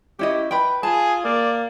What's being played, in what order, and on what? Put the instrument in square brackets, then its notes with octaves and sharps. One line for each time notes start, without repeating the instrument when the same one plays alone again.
[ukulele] C#4 E4 D#5 [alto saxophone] G4
[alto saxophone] B4 [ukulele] G5 B5
[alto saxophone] F4 [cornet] G#4 [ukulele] A5
[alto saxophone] A#3 [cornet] D5